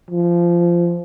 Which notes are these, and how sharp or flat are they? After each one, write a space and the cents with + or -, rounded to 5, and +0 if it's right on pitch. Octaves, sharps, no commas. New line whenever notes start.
F3 -20